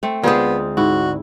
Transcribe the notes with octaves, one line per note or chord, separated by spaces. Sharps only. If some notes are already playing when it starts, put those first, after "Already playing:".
A3 C4
D2 G#3 B3 F4 G#4 C5
G#2 E4 F#4